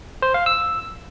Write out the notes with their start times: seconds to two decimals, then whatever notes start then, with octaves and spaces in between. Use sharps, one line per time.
0.22 C5
0.34 F5
0.46 E6